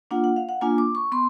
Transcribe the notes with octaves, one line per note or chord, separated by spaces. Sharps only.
A#3 D4 F4 F#5
F#5
F5
F#5
A#3 D4 F4 G#5
D6
C#6
B3 C6